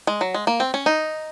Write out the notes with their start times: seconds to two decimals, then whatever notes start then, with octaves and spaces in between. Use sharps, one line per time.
0.07 G#3
0.21 F#3
0.34 G#3
0.47 A#3
0.60 C4
0.74 C#4
0.86 D#4